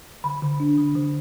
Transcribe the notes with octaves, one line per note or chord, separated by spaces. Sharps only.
D3 B5
D3
D4
D3
D3